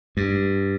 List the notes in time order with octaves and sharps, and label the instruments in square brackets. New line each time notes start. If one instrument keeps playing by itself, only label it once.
[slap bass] G2